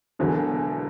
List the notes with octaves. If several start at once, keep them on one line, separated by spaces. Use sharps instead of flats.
E1 E2 D3 F#3